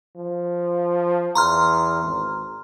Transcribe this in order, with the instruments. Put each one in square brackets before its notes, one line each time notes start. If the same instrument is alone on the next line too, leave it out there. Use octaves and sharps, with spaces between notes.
[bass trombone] F3
[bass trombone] E2 [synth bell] A#5 C6 F6
[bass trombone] G#1